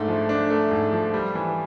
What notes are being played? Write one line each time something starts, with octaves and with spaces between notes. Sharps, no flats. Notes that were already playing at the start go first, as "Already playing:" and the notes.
Already playing: G#2 A3 D4
F3
D4
A3
G#2
F3
G3
E3